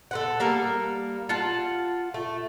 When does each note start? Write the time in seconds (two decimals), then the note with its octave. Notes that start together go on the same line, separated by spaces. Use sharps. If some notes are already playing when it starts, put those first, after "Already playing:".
0.11 A4 B4 F#5
0.40 G3 A#3 A#4
1.29 F4 F#5 A5
2.14 A3